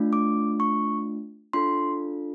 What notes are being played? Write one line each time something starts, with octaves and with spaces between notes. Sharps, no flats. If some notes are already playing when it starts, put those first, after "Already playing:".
Already playing: A3 D4 F4
D6
C#6
D4 F4 A4 C6